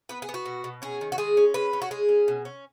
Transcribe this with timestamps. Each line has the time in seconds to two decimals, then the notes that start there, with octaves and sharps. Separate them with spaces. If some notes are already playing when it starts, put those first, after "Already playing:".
0.09 B3 B4
0.22 G#4
0.29 B3
0.34 F#4
0.46 B2
0.64 B2
0.82 C#4 G#4
1.01 D#3
1.12 F#4
1.18 G#3 G#4
1.37 C#4
1.54 G#3 B4
1.73 C#4
1.82 F#4
1.91 G#3 G#4
2.09 C#4
2.28 B2
2.45 C#4